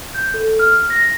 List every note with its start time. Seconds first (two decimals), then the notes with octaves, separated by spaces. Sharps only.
0.15 G6
0.34 A4
0.59 F6
0.90 A#6